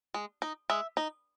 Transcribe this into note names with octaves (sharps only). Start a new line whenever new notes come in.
G#3
D#4
G#3 E5
D#4